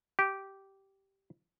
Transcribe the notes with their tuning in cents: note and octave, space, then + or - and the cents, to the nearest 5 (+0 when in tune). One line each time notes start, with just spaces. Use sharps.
G4 -10